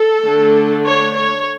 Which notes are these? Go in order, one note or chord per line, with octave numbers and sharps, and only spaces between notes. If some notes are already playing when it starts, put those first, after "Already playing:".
Already playing: A4
D3 A3 D4
C#5
C#5